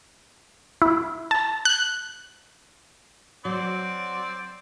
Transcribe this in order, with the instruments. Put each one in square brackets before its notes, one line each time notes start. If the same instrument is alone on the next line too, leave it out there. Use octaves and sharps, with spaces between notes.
[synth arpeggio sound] E4
A5
F#6
[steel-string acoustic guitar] F#3 [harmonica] C4 D5